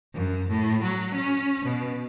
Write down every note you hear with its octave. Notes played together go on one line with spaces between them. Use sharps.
F#2
A2
F#3
C#4
B2